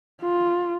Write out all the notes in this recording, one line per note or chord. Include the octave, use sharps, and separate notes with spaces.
F4